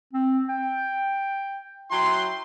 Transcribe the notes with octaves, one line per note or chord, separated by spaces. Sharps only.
C4
G5
F#3 E4 G5 C6